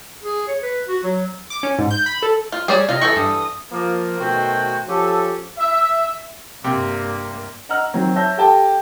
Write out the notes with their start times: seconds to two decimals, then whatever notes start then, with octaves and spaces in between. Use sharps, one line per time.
0.23 G#4
0.48 C#5
0.62 B4
0.87 F#4
1.04 F#3
1.50 D6
1.63 C#4
1.79 G#2
1.91 G6
2.06 B5
2.22 A4
2.52 F4
2.68 G3 G#4 C#5 D5 E7
2.89 C3 F4 D#5
3.01 E3 A4 C#6 G6
3.16 G2 D#6
3.72 F3 A#3
4.19 B2 D#3 A3 F#4 C5 G5
4.88 F3 C#4 G4 A4
5.58 E5
6.64 G2 C3 A#3
7.69 D#5 F#5 A#5 E6 F6
7.94 D#3 F#3 C4 A#5
8.15 C#5 E5 A5 E6 G6 A#6
8.38 G4 A4 G5 A5